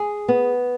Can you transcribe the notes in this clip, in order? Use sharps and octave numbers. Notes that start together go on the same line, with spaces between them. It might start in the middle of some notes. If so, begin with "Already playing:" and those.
Already playing: G#4
B3